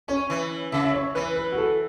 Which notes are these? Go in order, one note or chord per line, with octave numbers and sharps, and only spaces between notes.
C#4 C#5
E3
C#3 E5
E5
C#5
E3 B4
B4
F#4
A4